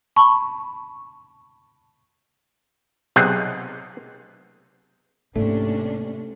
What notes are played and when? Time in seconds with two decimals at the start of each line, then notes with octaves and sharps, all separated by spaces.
0.16 A5 B5 C#6
3.16 B1 C3 G#4 F#5 G5
5.36 G#2 C3 A3 A#3 C#4 D4